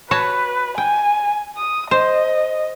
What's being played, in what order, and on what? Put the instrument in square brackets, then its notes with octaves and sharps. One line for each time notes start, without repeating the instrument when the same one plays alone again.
[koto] F#4 C#5 A5 [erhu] B4
[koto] G5 [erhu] G#5
[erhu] D#6
[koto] C5 [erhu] D#5